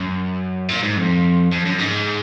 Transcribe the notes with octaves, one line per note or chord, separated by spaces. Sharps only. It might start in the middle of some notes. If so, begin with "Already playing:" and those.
Already playing: F#2
A#2
G#2
F2
F2
F#2
G#2